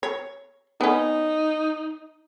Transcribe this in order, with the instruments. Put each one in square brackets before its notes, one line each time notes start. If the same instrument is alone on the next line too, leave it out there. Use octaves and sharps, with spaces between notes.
[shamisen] C#5
[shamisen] B3 C#4 [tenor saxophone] D#4